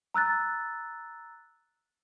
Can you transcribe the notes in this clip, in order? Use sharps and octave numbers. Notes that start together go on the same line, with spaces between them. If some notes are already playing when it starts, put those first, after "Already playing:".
A#5 E6 F#6 A6